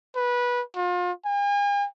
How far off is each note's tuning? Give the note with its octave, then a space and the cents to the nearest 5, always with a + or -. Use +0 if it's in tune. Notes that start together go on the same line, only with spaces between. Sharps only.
B4 -15
F4 +35
G#5 -45